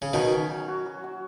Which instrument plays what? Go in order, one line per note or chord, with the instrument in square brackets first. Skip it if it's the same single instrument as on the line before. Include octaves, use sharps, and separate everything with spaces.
[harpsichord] C#3
[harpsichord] B2 D#3 [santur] F#3
[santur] C#4
F#3
F#4
F#3
F#4